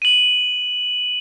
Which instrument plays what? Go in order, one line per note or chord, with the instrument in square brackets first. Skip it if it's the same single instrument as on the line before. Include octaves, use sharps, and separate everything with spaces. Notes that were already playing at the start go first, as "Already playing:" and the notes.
[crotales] D#7 F#7